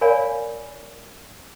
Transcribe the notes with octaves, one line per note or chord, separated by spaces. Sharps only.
A#4 C#5 D5 F5 G#5 B5